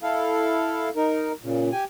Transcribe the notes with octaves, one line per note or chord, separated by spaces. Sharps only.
E4 A4 F5
D#4 A#4
A#2 C#3
G4 G#5